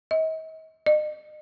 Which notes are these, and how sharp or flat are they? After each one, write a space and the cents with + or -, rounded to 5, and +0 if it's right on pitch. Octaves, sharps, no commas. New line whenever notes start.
D#5 +40
D#5 -40